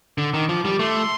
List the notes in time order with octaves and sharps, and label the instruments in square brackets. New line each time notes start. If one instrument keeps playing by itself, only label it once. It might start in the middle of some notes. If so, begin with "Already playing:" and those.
[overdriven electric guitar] D3 [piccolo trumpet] D6
[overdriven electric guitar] D#3
[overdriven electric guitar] F3 [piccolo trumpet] D6
[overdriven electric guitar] G3
[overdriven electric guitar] A3 [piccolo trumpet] C6